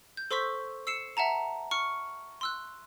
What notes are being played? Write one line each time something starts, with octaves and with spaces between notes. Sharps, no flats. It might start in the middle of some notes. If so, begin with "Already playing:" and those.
G6
A4 C5 C6 C#6 E6 B6
E6 C7 C#7 E7
E5 F#5 A5 A#5
C#6 F6 C#7
C6 E6 F#6